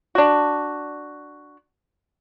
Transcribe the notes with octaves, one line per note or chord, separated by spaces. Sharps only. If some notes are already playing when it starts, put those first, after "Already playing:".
D4 F#4